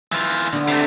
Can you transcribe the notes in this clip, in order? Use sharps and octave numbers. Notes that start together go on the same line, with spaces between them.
E3 F4
D3 B3
C3 A3